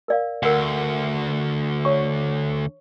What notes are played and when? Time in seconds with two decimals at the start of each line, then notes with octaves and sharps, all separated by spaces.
0.08 A#4 D5 F5
0.43 D2 A#4 F#5
1.85 C#5 C#6